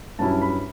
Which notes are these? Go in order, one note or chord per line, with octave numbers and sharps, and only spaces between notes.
G2 F#3 C#4 E4 A5
B5